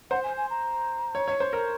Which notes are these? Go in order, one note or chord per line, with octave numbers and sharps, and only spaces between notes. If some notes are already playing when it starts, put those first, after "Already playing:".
C5 F#5
G#5
G#5
A#5
C#5
C#5
C5
A#4